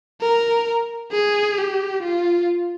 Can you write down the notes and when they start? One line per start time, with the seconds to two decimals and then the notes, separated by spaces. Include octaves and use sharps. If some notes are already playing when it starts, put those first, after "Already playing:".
0.21 A#4
1.12 G#4
1.58 G4
2.03 F4